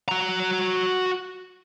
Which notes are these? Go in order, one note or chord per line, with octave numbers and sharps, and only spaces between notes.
F#4 A#5